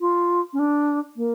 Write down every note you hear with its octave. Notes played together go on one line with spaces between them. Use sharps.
F4
C#4
D4
A#3